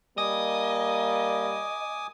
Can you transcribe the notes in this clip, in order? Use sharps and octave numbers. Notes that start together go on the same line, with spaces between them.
G3 A#3 D#5 G#5 D6 D#6